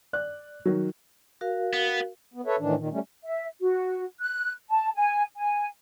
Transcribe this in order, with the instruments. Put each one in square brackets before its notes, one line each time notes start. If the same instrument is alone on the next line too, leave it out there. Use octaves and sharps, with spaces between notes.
[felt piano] D5 F#6
D#3 F#3
[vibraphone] F#4 A#4 F5
[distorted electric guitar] B3
[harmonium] B3
A4 B4 C#5 E5
A2 D#3 E3 D4
A#2 D#3
G3 A3 C#4
[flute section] E5
F#4
F#6
A5
G#5
G#5